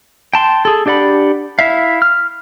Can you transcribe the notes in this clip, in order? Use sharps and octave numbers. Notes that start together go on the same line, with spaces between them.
G5 A5 C6
G#4 A4
D4 G4 D5 F#5 B5
E4 E5 F5
F6